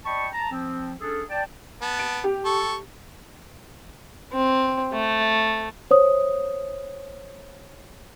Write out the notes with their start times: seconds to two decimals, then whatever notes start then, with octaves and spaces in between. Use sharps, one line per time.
0.04 D5 D#5 G5 A5 B5 C#6
0.32 A5 A#5
0.51 F3 C4
1.00 C#4 D4 G#4 A4
1.29 D5 G5 A5
1.82 B3 A5
1.99 D7
2.24 G4
2.45 A4 C#6
4.33 C4
4.93 A3
5.91 C5 C#5 D#6